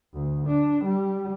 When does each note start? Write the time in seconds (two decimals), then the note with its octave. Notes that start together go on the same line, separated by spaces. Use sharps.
0.13 D2
0.47 D4
0.85 G3